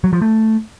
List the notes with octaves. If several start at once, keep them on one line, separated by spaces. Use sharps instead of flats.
F#3
F3
A3